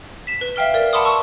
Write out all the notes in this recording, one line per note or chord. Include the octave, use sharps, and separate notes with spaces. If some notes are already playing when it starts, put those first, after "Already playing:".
B6 E7
B4
E5 F5 G5 F6 G7
A#4 D5
F#5 A5 B5 C6 D6 D#6
A5 C#6 E6